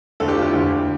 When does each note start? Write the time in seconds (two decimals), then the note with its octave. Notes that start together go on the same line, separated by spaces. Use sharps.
0.20 D2 A4
0.28 G4
0.35 F4
0.42 E4 G4
0.53 D2